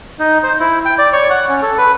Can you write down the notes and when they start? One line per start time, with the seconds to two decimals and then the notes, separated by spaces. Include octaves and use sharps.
0.19 D#4
0.43 C5
0.60 E4
0.85 G5
0.98 D5
1.13 C#5
1.30 F#5
1.49 C#4
1.62 A4
1.78 B4